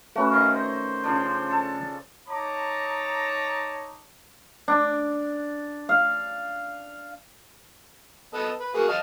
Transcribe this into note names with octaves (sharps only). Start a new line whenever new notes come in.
A3 C#4 F#4 B4
D#3 C4 D#5 F5
C5
C#3 F3 D4
A4 A5
D#4 C#5 A5 A#5 D6
D4
F5
B3 A4 D#5
B4
A#3 F#4 G#4
D#5 F5 A5